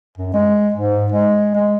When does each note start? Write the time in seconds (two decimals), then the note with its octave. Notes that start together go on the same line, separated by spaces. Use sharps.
0.18 F#2
0.34 G#3
0.74 G#2
1.12 G#3
1.55 G#3